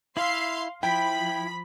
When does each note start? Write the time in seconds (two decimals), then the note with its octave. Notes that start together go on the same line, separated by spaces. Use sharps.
0.17 E4 E5 F5 C6 C7
0.83 F3 E4 G5 B5